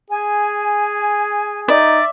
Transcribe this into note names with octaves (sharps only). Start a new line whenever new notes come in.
G#4 G#5
D#4 D5 E5